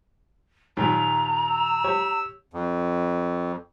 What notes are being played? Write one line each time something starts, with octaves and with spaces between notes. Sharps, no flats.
D#2 A#2 D#3 A#5
E6
G4 C#5
F2